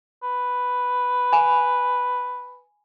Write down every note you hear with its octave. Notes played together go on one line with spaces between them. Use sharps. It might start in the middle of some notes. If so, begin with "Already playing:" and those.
B4
G#5 B5